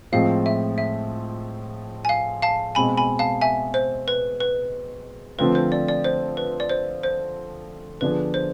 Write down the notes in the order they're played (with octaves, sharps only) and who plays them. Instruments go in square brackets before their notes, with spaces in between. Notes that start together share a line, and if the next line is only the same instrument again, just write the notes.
[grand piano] A2 F3 G#3 C4 [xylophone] F5
[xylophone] E5
E5
G#5
F5
F5 A5
[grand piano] B2 G#3 C4 [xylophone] G#5 B5
[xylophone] G#5 B5
F5 A5
E5 G#5
C5
B4
B4
[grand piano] D3 F3 A3 C4 F4 [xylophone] B4
[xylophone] C5
D5
D5
C5
B4
D5
C5
C5
[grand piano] D3 F3 B3 D4 G#4 [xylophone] B4
[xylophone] C5